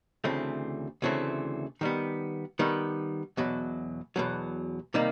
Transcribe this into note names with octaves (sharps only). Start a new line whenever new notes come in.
D2 C#3 E3 A3 C4
D2 C#3 E3 A3 C4
D#3 G3 B3
D#3 G3 B3
E2 B2 F#3
E2 B2 F#3
C3 D#3 G3 A#3